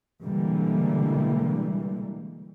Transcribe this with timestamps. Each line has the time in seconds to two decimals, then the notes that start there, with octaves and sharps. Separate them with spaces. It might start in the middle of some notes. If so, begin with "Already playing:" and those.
0.23 B2 D3 E3 G3 G#3 A#3